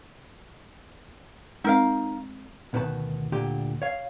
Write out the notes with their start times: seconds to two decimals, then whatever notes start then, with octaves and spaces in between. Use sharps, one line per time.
1.64 G#3 C4 D#4 A#4 F5
2.73 D2 B2 D#3 B4 A5
3.32 D2 A#2 D3 G4
3.82 C#5 F5